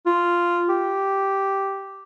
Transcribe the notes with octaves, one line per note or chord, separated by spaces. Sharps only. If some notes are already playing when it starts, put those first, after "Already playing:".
F4
G4